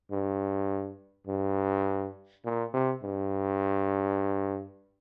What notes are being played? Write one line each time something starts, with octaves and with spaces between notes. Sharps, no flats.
G2
G2
A#2
C3
G2